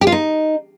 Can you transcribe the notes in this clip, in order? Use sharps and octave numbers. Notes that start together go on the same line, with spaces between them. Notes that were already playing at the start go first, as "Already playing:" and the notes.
G4
F4
D#4